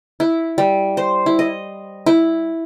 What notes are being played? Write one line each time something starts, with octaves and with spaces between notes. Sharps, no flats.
E4
G3
C5
E4
D#5
E4